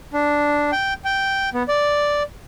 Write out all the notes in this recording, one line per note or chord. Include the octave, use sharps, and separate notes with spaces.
D4
G5
G5
B3
D5